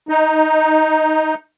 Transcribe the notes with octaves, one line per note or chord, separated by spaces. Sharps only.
D#4